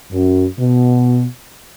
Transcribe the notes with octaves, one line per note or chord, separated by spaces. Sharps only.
F#2
B2